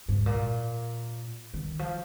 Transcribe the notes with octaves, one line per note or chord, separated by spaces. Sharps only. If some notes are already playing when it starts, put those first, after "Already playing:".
G#2
A#2
D#3
F3